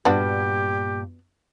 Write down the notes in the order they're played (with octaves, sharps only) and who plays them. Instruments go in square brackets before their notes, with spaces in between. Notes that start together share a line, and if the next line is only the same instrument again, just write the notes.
[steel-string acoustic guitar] G2 A#2 [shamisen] B3 D4 F#4 [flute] G4